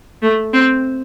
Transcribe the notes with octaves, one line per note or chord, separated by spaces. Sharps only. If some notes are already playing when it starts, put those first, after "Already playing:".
A3
C4